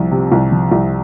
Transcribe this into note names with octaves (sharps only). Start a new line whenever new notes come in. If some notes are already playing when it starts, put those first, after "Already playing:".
Already playing: C2 F3
C3
C2
F3
C2